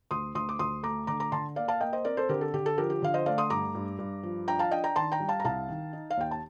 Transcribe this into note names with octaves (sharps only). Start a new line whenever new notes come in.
D2 C6 D#6
D2 C6 D#6
D6
D2 C6 D#6
A3 A#5 D6
D3 A#5 D6
A#5 D6
D3 A5 C6
A#3 D5 F5
F5 A5
A#3 D#5 G5
C5 D#5
C4 A#4 D5
A4 C5
D3 G4 A#4
A4
D3 G4
A4
F3 G4 A#4
G4
D3 F5
C5 D#5
A3 D5 F5
C6 D#6
G2 A#5 D6
G2
G2
F3
D4 G5 A#5
F5 A5
D4 D#5 G5
G5 A#5
D#3 A5 C6
G5 A#5
G3
F5 A5
A#5
C2 F5 A5
D#3
D#4
F5
D#2 G5
A5